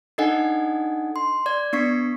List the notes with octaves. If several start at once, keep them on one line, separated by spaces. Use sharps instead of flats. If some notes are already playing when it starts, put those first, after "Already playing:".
D4 D#4 A4 D#5 F#5 G#5
C6
D5 G#6
B3 D4 C#6 B6